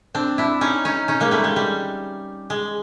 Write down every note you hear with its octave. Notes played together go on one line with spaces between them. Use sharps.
C4 D4
D4 E4
C#4 D#4
C#4 D#4
C#4 D#4
G#3 A#3
G3 A3
G#3
G3
G#3